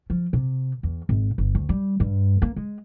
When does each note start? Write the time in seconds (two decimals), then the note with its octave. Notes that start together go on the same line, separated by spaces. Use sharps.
0.10 F3
0.33 C3
0.83 E2
1.09 G#1
1.38 G1
1.55 D2
1.69 G3
2.00 G2
2.42 A#3
2.56 G#3